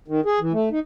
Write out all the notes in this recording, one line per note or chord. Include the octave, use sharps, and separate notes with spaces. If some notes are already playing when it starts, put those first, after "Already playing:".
D#3
G#4
E3
A3
D#4